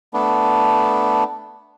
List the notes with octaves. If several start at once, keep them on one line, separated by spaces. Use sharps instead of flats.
A3 B3 D4